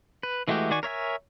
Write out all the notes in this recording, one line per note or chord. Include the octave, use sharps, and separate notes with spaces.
B4
E3 G#3 A3 F#4 G4
D#3 F#4 D5 G#5 C#6
A#4 C#5 E5 G#5